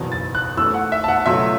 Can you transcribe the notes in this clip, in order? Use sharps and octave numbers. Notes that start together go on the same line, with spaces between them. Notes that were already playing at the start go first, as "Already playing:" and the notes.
Already playing: F#1 E2 B2
A6
F#6
E2 E3 A3 E6
F#5
E5
A5
F#5
C#2 B2 F#3 A3 E5